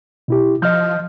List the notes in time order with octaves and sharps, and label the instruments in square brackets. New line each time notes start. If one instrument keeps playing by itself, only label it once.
[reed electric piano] B2 E4 G4
[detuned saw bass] F3 [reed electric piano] D#5 F6 G6